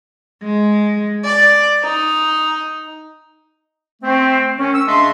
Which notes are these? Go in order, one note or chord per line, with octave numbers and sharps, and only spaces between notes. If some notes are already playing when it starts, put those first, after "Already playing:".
G#3
D5
D#4
A3 C4
D#3 C#4
E6
C#3 A3 D4 D#5 C6